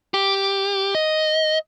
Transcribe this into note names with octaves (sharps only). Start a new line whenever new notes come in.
G4
D#5